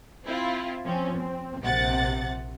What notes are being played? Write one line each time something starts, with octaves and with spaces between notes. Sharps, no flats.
C4 E4 F4
F3 C4 C#4
C4
A#1 C3 F#5 A6